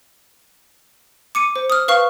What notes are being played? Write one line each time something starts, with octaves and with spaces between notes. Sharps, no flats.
D6 C#7 D#7
C5
D#6 F6
B4 F5 C#6 F6